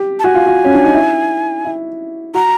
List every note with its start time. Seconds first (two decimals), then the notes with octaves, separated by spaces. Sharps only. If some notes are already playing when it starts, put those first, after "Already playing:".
Already playing: G4
0.19 A5
0.24 F#4 G#5
0.34 F4
0.46 F#4
0.64 C#4
0.74 D4
0.84 D#4
0.94 E4
1.65 E4
2.34 F#4 A#5